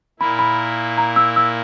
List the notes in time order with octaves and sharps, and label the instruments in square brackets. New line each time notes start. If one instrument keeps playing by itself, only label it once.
[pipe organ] A#2 A#3 E4 [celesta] B5
[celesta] B5
A#5
E6
E6